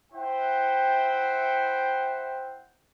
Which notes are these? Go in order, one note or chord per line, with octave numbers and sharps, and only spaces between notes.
E4 C5 E5 F#5 G5